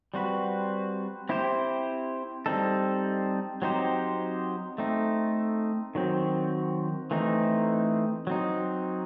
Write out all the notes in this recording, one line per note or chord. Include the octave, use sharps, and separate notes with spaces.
G3 C4 F#4 B4
C4 E4 G4 C5
G3 C4 D#4 A4
F#3 C4 D#4 G4 C5
A3 C4 D#4
D#3 F#3 C4
E3 A3 C4 D#4
F#3 C4 D#4